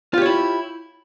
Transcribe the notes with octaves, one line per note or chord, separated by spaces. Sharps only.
E4 F4 G4 C#5